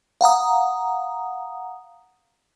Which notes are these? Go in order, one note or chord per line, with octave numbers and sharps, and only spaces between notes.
F5 F#5 A#5 D#6